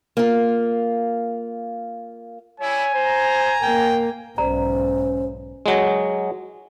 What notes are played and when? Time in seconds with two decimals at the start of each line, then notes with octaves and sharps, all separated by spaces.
0.17 A#3 F4
2.60 G3 E4 C#5 G#5
2.94 C5 A#5
3.63 A#3 G5
4.38 B1 G#2 C#4 C5 D5 A#5
5.66 F#3 G#3